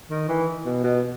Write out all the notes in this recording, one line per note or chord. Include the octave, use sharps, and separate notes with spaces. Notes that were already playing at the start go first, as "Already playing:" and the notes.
D#3
E3
B2
B2